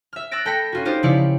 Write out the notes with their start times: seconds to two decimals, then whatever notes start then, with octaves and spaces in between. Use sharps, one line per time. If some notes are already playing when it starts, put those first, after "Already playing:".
0.13 E5 F6
0.31 E6 F#6 A6 A#6 D7
0.46 A4 G5 B5 A#6 B6 C#7
0.72 C#4 F4 F#4
0.85 D#4 F4 G4 C5
1.03 C#3 F3 E4 D5 F5 C#7